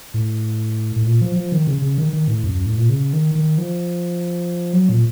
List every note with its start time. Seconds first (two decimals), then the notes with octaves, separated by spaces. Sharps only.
0.14 A2
0.96 A2
1.06 A#2
1.22 F3
1.36 F3
1.52 D#3
1.67 C#3
1.82 C#3
1.98 D#3
2.13 D#3
2.28 A2
2.44 F#2
2.55 F#2
2.66 A2
2.77 A#2
2.90 C#3
3.13 D#3
3.35 D#3
3.58 F3
4.73 F#3
4.89 A#2